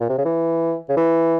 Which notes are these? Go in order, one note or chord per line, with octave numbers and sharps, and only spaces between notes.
A#2
C3
C#3
E3
C#3
E3